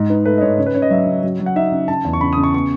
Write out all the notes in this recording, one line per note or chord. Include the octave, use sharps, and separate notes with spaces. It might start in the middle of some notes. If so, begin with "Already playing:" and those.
Already playing: G#2
D#4 B4
A3 B4
D#5
G#2 C#5
C#3 C#5
B4
C#3 C#5
D#5
F#3 E5
C#3
F#3
F#3
F#5
D#4 E5
C#3
C#3 A5
E2
C#6
C#3 B5
D#6
C#3
C#6
B3 C#6